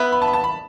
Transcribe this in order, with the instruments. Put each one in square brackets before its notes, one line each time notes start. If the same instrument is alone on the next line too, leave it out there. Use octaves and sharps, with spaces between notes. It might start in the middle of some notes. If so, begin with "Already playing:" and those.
Already playing: [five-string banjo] B3 E4 B4 [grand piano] B5
[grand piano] B5
A5
B5
A5
B5